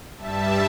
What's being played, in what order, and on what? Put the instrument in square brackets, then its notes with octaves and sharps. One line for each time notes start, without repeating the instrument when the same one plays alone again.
[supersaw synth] G2 G3 E5 A5